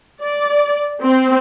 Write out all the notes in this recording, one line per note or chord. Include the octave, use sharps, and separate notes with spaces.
D5
C4